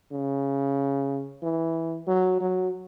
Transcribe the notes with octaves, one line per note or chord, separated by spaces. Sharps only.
C#3
E3
F#3
F#3